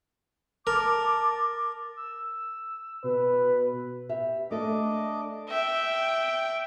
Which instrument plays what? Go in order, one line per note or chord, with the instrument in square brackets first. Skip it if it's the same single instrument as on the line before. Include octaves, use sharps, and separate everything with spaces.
[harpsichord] A#4 [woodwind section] A5 D6
[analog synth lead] E6
[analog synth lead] B2 [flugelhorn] B4
[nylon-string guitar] G4 E5
[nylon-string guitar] A3 A4 [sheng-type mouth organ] D4 D#5 D6
[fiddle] E5 G5